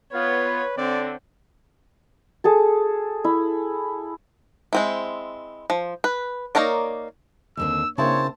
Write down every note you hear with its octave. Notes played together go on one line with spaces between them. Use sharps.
B3 F4 B4 C#5
D3 C4 D5
G#4 A4 A5
E4
G#3 C4 E4
F3
B4
A#3 D#4 A#4 C#5 D5
D#2 D3 C4 E6
C#3 A#3 C4 D4 E4 C#5 A5